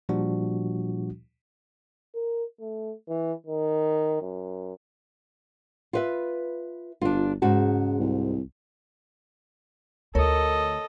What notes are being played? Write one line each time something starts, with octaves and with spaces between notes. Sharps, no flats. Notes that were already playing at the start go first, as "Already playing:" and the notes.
A#2 F3 G3 D4 F#4
A#4
A3
E3
D#3
F#2
F4 B4 E5
G1 D4 F4
G#2 C#3 F#4 A5
C2
D2 F4 A4 A#4 C#5 D#5